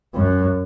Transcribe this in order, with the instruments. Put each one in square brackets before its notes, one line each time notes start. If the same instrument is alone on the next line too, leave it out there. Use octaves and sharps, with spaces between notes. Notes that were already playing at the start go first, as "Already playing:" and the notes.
[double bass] F#2